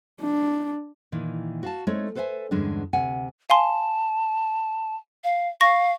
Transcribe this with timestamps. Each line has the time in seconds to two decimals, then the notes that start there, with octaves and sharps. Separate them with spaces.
0.21 D4
1.12 A#2 D#3 E3
1.63 F#4 F5 A5
1.87 G#3 A3 C4 D#4 A4 C#5
2.15 A4 B4 C5 D5 E5 G#5
2.51 E2 G2 D3 G#3 C#4 D4
2.93 D2 C3 F#5 G#5
3.50 F5 G#5 A5 C6
5.24 F5
5.61 F5 C#6 A#6